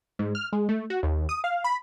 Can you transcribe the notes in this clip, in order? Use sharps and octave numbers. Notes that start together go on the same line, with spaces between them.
G#2
F6
G#3
A3
F#4
D#2
D#6
F5
B5